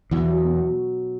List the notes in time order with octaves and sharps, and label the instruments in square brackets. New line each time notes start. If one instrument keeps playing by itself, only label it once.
[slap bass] E2 E3 [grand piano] B2
[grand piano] F#3
B2
B2